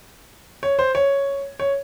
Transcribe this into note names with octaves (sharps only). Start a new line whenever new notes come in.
C#5
C5
C#5
C#5